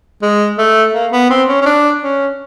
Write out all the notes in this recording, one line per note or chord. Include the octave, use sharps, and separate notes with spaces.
G#3
A3
A#3
B3
C4
C#4
C#4
D4
C#4